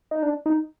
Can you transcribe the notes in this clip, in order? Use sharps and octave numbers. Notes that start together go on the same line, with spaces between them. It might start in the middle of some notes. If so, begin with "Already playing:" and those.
D#4
D4
D#4